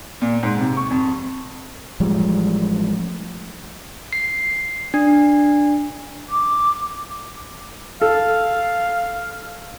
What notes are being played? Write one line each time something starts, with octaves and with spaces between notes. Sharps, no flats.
A#2
G#2
C3
C#6
F2
A1 F3 G3 G#3
C7
D4
D6
A4 F5